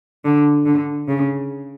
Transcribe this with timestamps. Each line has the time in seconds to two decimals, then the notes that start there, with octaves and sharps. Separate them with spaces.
0.25 D3
0.66 D3
1.08 C#3